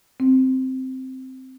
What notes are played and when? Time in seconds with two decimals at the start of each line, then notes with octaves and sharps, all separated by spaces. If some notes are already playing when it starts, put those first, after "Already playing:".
0.20 C4